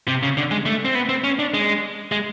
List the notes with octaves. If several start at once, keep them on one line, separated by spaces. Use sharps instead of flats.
C3
C#3
D3
G#3
A3
C4
B3
C4
C#4
D4
G#3
G#3